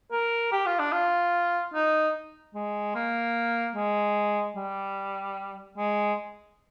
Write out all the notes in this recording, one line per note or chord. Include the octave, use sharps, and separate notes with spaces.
A#4
G4
F4
D4
F4
D#4
G#3
A#3
G#3
G3
G#3